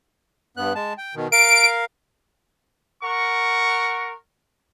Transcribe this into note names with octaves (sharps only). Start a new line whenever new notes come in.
G2 B3 F#6
G#3 A5
G5
B2 D#3
A#4 F5 D7
A#4 F#5 C#6